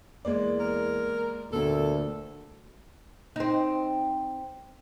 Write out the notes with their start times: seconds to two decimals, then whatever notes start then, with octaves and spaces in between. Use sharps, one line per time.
0.25 E2 G#3 A#3 D5
0.60 A#4
1.52 D2 A#2 A#3 A4
3.36 C4 D#4